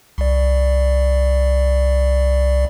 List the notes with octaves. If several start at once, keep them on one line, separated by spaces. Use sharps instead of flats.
C2 D5